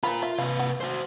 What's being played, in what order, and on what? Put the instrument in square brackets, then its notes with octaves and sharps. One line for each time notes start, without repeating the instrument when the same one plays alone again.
[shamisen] F3 F5 B5 [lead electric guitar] F4 A#4
[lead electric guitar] F4 [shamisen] E5
[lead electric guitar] C3 B4 [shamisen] F5
[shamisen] F#5
[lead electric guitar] F#4 C5